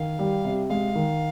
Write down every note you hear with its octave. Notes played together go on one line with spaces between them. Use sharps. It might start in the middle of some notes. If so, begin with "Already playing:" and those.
Already playing: D#3 F5
G3
C3
G#3 F5
D#3